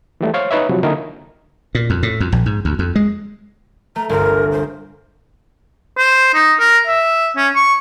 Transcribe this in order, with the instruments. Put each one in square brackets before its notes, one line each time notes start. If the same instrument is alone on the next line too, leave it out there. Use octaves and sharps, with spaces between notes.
[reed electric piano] E3 G3 A3
C5 C#5 F5
D#4 B4 C#5 E5
C3 F3 F#3
D3 A#3 D#4 E4 A#4
[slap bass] A#2
F2
A2
F2
A#1
G#2
D2
F2
G#3
[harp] A3 [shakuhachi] A#5
[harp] G1 C2 [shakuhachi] A#4
[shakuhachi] C5
[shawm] C5
D#4
A#4
E5
C#4
C#6